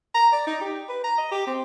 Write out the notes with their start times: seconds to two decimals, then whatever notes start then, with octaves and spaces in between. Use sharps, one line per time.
0.14 A#5
0.32 D5
0.47 D#4
0.61 G4
0.89 B4
1.04 A#5
1.18 D#5
1.31 G4
1.47 C4